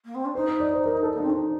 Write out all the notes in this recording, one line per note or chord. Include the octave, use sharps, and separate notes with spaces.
A#3
C4
D4
D#4 C5
C5
D5
C5
A#4
A4
A#3
C4 D#4
D4
D#4